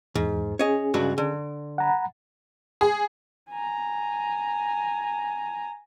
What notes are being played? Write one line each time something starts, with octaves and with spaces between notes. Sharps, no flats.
E2 G#2
C#4 G#4 C#5 D#5
C#2 G2 F#4
D3
F#5 A#5 B5
G#4
G#5 A#5